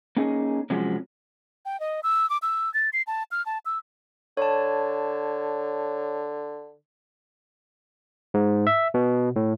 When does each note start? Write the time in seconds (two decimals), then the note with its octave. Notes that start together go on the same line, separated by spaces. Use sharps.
0.17 A#3 C#4 D#4 G#4
0.70 C3 F3 F#3 G#3 C#4
1.66 G5
1.80 D#5
2.03 E6
2.30 D6
2.42 E6
2.74 A6
2.93 C7
3.07 A5
3.32 F6
3.46 A5
3.66 E6
4.37 D3 C#5 A5
8.34 G#2
8.67 E5
8.94 B2
9.36 A2